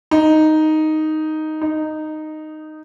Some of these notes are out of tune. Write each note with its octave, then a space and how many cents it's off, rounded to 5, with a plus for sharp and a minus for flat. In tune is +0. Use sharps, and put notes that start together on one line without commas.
D#4 +0
D#4 -10